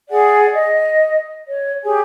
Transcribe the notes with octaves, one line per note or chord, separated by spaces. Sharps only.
G#4 D5 F#5 G#5
D#5
C#5
G4 G#4 G#5